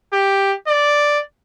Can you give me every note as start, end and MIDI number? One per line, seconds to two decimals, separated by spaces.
0.13 0.54 67
0.68 1.19 74